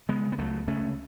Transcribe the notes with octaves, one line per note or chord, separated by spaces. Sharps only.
C#3 G#3 B3
B3
C#2 F#3 A3
C#3 A3 C#4